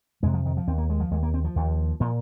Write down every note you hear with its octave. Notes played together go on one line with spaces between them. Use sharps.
F2 C3 G#3
F3
D#3
F3
D#2 C4
A#3
G#3
F3
D#2 G#3
A#3
C4
F3
D#2
A#2 F3